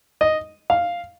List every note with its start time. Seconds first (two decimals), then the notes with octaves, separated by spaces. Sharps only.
0.21 D#5
0.70 F5